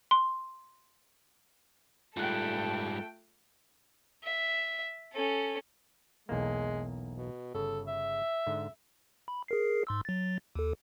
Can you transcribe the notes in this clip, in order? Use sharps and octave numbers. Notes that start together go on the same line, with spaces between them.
C6
G#2 G3 A3 F4 A4 G5 F#6
E5
C#4 A4
B1 E2 G#3 A#3
B2
G1 C#3 A4
E5
G#2 D3
B5
G#4 A#4 C7
G#2 C6 E6
F#3 A6
D#2 A4